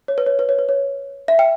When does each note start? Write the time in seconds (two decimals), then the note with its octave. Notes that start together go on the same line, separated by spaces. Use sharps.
0.08 C#5
0.18 B4
0.26 C#5
0.39 B4
0.49 C#5
0.59 B4
0.69 C#5
1.28 E5
1.39 G5